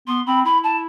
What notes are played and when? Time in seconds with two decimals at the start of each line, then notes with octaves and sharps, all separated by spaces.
0.07 B3 C6
0.27 C4 B5
0.45 E4 B5
0.64 A5